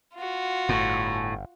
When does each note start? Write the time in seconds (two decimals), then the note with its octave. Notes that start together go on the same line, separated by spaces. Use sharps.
0.15 F4 F#4
0.69 G1 A2